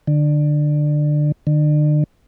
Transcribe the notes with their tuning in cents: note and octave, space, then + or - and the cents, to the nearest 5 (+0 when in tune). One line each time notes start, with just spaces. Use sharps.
D3 +20
D3 +40